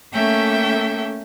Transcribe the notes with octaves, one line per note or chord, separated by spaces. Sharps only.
A3 A#3 C#4 A4 E5 G5